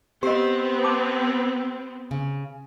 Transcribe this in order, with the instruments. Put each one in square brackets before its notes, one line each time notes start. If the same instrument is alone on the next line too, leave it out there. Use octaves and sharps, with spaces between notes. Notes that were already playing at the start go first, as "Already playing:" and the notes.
[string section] B3 C4 [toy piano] G4 D#5 [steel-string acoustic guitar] C5
[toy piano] A5 D6
[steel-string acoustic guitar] C#3